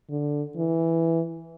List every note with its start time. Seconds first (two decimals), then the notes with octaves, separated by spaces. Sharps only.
0.10 D3
0.56 E3